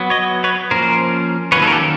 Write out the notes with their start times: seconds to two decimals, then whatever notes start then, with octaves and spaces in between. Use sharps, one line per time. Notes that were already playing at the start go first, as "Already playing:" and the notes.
Already playing: F#3 B3
0.10 C#5 D#5
0.44 B4 C#5
0.71 F3 A#3 C#4 A#4 C5
1.52 D#3 F#3 A#3 C#4 B4 C#5
1.62 A4 B4
1.67 A#4
1.72 G4 A4